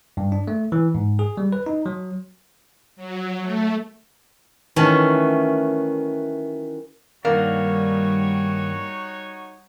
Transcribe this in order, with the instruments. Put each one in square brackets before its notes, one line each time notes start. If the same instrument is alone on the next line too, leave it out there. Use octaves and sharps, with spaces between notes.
[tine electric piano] G2
D4
A3
E3
G#2
G#4
G3
B4
D#4
F#3
[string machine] F#3
A3
[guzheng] D#3 E3 F#3 A3 C#4
[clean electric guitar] G2 D#3 D4 [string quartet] G3 [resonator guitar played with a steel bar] A#3 [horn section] D#4 F#4 C#5